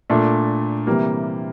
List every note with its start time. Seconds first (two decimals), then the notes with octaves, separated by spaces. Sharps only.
0.10 A#2 A3 D4
0.87 C3 E3 G3 A#3